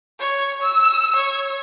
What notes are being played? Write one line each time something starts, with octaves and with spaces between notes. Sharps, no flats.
C#5
E6
C#5